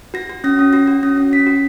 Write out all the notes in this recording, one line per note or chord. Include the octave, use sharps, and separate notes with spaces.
F#4 A#6
F#4
C#4 A#6
C#4
F#4 A#6
F#4
C#4 A#6
C#4
C#4 B6
F#4